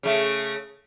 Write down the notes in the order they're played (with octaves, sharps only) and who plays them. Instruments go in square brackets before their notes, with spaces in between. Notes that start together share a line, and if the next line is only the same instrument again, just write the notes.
[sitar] C#3 A3